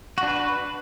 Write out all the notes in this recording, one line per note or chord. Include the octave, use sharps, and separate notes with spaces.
D4 F#4 B4